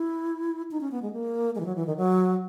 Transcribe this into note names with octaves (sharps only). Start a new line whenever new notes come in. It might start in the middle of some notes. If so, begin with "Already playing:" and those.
Already playing: E4
D#4
C#4
B3
G#3
A#3
G#3
E3
F#3
E3
D#3
F#3